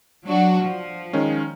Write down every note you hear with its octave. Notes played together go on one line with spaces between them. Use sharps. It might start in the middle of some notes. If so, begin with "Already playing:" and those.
F#3 D4 F#4
F3
D#3 G#3 C#4